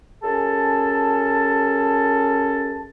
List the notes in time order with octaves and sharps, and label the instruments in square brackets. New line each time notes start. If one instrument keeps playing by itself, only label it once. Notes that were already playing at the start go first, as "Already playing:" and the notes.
[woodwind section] F#2 C#4 G#4 A4 A5